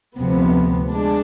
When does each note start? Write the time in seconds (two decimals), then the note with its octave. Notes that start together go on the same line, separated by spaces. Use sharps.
0.19 D2 C3 F3 B3
0.91 G#3 D4